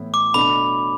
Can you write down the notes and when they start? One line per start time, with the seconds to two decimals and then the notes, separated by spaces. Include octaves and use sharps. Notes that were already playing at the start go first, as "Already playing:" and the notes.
Already playing: A2 E3 B3 E4
0.14 D6
0.34 B2 A3 D4 B5